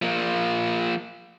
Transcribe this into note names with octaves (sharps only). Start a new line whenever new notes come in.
F3 A#3